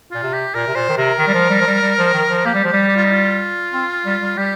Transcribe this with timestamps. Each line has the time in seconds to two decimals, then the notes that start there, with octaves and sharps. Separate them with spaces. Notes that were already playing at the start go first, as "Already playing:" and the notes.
0.11 A#2 F4
0.23 C3
0.34 G4
0.55 A#2 A#4
0.68 C3
0.75 A#2 C5
0.89 D#3
0.97 C3 A#4
1.19 D#3
1.28 G3
1.34 F3
1.50 G3
1.61 F3
1.66 G3
1.82 G3
1.98 F3
2.13 D#3
2.30 F3
2.45 A#3 G4
2.54 G3
2.65 F3 G4
2.73 G3
2.89 G4
2.97 F4
3.05 D#4
3.12 F4
3.73 C4
4.06 G3
4.22 G3
4.38 G3 G4